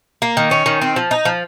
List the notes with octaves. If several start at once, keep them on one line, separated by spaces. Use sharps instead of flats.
A#3
D#3
C#4
D#3
C4
F3
D#4
F3